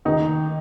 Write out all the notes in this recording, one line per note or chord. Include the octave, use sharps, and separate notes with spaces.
D#2 D#3 D#4